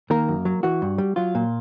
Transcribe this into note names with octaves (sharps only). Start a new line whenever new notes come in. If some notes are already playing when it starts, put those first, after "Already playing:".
D#3 A#3 A#4
F#2
F#3
E3 F#4
G2
G3
F#3 F4
A#2